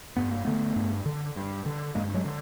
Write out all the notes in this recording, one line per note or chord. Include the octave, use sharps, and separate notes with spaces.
G2 B3
A#3
D3 A3 B3
G2
D3
G2
D3
G2 G#3 A#3
F#3 G#3
D3